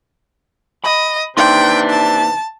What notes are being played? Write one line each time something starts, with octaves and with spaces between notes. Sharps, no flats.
D#5 B5
C3 E3 A#3 D4 D#4 G5 C6
A5